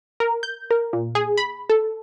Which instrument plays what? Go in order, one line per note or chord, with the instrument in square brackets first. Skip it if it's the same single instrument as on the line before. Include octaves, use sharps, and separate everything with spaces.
[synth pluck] A#4
G6
A#4
A#2
G#4
B5
A4